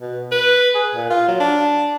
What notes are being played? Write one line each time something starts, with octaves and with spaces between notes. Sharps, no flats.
B2
B4
G#4
A#2
F4
F#3
D4